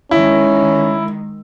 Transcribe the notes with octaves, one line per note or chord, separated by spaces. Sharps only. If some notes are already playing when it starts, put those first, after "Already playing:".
D#3 G#3 C#4 E4